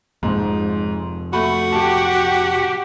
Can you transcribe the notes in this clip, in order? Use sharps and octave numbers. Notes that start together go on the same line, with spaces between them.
F2 G#2 C3 F3
A3 F#4 B5
G4 A5